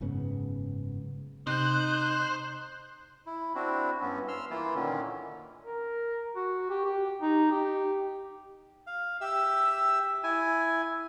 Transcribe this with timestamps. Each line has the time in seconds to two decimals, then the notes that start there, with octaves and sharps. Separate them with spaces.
0.01 F#1 G#2 C#3 B3
1.47 C3 D#4 C5 F#6 G6
3.27 E4
3.55 C4 D4 E4 F#4
4.01 G2 B3 C#4
4.28 C6 E6 F6
4.51 E3 A#3 E4 F4
4.75 A#2 D3 D#3 C#4
5.62 A#4
6.36 F#4
6.70 G4
6.85 G4
7.22 D#4
7.51 G4
8.87 F5
9.21 G4 E5 E6
10.24 E4 G#5